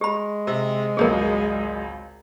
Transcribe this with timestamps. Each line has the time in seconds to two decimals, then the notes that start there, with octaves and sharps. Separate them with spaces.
0.01 G#3 G4 B5
0.47 C3
0.97 G#1 C#2 F#3 G#4 A#4